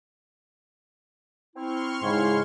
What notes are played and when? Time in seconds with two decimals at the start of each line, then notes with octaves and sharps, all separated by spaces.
1.56 C4 E4 C6 C#6 F6
2.02 G#2 C#3 E4